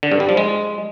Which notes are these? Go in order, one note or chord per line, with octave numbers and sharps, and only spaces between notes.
D3
G2
G3
F3
G#3